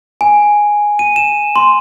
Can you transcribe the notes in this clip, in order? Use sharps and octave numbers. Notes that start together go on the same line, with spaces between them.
G#5
D#7
E7
C6